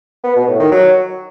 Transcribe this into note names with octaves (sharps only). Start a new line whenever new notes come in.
B3
B2
A2
D#3
F#3